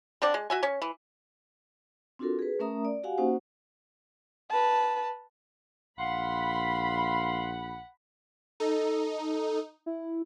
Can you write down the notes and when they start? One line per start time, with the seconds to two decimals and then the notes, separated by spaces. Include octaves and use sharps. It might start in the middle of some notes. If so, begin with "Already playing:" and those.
0.22 D3 C4 D4 D5
0.34 G#3
0.50 F#4 E5 G#5
0.63 C#4 C#5
0.82 E3
2.19 C4 D4 F4 F#4 A4 A#4
2.39 G#4 B4
2.59 A3 C#4 A#4 E5 A#5 D#6
2.85 D5
3.03 F#4 G4 F5 F#5 G#5
3.18 A#3 C#4 D#4 F#4 C5 F#5
4.50 B4 A5
5.99 A#1 F5 F#5 B5 C6
8.60 D#4 A4
9.86 E4